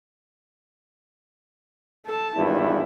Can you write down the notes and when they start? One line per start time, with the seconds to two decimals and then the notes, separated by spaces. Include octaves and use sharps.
2.06 A4 A5
2.36 G#1 E2 G2 E4